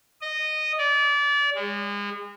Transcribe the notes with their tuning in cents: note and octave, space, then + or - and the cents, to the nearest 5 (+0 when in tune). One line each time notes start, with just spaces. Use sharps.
D#5 -15
D5 -30
G#3 -35